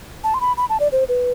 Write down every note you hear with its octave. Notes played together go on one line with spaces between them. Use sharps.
A5
C6
B5
B5
A5
D5
C5
B4